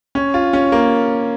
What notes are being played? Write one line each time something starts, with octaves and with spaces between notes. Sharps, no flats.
C#4
F4
C#4
A#3